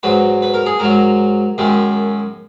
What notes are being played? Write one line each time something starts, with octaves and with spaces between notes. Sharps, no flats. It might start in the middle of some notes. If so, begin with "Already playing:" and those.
G#2 F#3 B4
B4
A#4
G#4
G#2 F#3 A#4
F#2 D#3 G#3